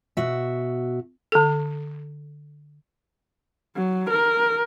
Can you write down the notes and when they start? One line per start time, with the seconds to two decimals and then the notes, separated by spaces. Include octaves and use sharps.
0.17 B2 F#4 E5
1.32 D3 A4
3.76 F#3
4.10 A#4